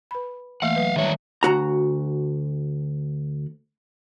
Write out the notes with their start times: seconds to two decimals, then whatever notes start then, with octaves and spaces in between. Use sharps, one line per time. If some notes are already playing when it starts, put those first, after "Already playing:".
0.11 B4 B5
0.62 E3 A3 A#3 F5 F#5
0.76 F#3 B4
0.96 D#3 G3 C#5 E5
1.43 D2 F#4 A#5